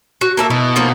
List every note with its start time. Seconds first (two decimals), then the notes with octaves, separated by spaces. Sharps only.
0.21 F#4
0.37 A#3 A4 E5
0.50 B2 E4
0.76 F3 A#3 D#4